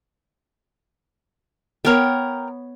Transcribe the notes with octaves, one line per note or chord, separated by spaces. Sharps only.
B3 A#4 C#5 G5